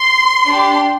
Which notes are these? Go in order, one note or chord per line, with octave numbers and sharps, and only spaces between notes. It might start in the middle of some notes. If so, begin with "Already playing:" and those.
Already playing: C6
D4 G4